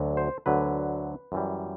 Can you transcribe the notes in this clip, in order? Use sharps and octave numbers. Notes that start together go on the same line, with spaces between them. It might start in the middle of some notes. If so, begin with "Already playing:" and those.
Already playing: D2 D3 F#3
C5
D2 D3 F#3 B4
F#2 E3 G3